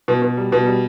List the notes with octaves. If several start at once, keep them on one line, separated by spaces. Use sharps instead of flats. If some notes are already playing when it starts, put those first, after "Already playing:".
B2
B2
G3
B2
G3